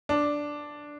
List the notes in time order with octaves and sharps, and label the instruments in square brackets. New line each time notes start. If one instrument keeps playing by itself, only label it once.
[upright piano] D4